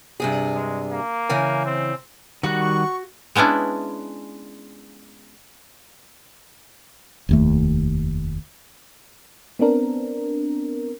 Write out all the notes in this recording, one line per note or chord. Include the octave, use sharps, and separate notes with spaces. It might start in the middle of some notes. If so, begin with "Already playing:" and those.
G2 C3 G#4
G#3
A#3
C#3 E3 G#5
C4
D#3 G3 F#4 F#5
C#6
G#3 B3 C#4 D4 E4
F1 D#2 A3
B3 C4 D4 A#4